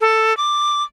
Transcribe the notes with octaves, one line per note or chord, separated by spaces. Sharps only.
A4
D6